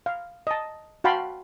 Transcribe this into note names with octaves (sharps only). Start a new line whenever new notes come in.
F5
D#5 A5
F#4 F5 G5 A5 B5 C6